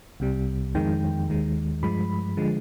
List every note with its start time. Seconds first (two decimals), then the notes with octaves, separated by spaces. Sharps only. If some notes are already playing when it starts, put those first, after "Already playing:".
0.20 C2 C3 G3
0.75 F2 D#3 G#3 G5
1.28 D#2 D#3 G#3
1.83 G2 F3 G#3 B5
2.37 D3 F3 G#3